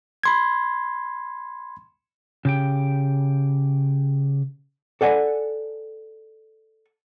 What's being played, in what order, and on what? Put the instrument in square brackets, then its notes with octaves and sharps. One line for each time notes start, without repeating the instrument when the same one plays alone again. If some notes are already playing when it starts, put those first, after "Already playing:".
[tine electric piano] B5 C6 G#6
[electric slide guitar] C#3 G4 G5
[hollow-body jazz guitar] A4 D5 F#5 G#5